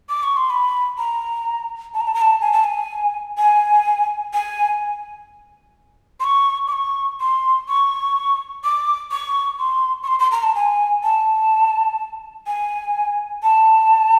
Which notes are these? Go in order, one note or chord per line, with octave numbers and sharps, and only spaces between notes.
D6
C#6
C6
B5
A#5
A5
A#5
A5
A#5
A5
G#5
A5
G#5
G#5
G#5
C6
C#6
D6
C#6
C6
C#6
D6
C#6
C6
C#6
C6
C6
A#5
A5
G#5
A5
G#5
A5